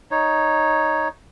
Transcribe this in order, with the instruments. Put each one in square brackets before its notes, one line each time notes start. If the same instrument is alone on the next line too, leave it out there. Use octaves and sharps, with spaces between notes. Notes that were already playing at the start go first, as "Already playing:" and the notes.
[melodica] D#4 C#5